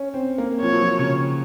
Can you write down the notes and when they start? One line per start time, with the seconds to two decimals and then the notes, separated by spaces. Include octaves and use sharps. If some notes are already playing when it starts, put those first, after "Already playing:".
Already playing: C#4
0.14 C4
0.38 A#3
0.62 F3 C#5
0.72 F#3
0.82 F3
0.99 C#3